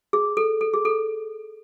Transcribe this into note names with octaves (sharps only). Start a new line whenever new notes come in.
G#4
A4
A4
G#4
A4